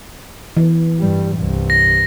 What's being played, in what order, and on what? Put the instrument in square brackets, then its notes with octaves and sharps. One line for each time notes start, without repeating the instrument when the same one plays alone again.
[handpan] E3
[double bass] G2 G3
C2 G2
[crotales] A#6